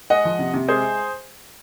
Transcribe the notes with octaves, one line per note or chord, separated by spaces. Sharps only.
G#3 D#5 F#5
F3
C3
C3
G#3 G#4 C5